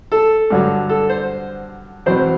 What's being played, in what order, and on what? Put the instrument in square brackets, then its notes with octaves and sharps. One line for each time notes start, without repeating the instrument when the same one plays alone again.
[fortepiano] A4
G2 D3 F#3
A4
C5
E2 B2 F#3 C4 C5